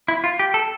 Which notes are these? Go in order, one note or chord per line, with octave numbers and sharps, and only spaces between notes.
E4
F4
G4
A4